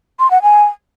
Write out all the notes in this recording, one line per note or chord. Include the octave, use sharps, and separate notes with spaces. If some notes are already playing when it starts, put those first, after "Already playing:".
C6
F#5
G#5